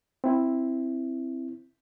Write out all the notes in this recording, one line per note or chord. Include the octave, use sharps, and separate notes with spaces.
C4 E4